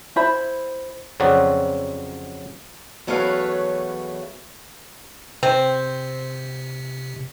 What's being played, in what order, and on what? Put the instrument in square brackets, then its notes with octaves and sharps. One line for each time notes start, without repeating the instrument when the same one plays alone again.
[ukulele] E4 C5 B5
[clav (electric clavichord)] F2 C#3 F#3 C4 F#4 D5
[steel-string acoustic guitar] E2 F#3 A3 B4 C#5 F5
[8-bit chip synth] C3 [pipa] C4